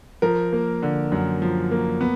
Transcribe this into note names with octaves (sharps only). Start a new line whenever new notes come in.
F3 A#4
A#3
D3
F#2
F3
A#3
B3